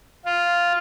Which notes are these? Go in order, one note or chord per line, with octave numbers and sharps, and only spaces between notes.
F4